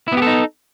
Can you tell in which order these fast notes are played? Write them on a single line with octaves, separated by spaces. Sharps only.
E4 B3 G4 A4 D#4